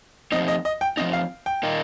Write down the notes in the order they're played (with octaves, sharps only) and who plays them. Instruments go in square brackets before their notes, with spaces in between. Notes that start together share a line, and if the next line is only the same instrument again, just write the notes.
[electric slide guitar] F2 F3 C4 D#4 [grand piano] D#5
[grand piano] D#5
D#5
G5
[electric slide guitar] F2 F3 C4 D#4 [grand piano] D#5
[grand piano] F5
G5
[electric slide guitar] A#2 A#3 D#4